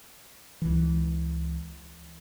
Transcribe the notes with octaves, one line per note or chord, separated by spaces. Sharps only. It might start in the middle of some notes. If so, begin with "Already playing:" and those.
C#2 E3